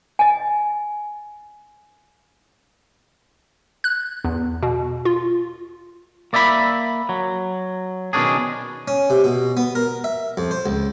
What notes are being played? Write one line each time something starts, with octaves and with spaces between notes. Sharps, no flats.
D#5 G#5
F#6
E2
B2
F4
A#3 D5 E5 G#5 B5
F#3
B2 D#3 C#4 D4 G#4
C#4
C3
B2
B3
A#4
E5
F2
C5
C#2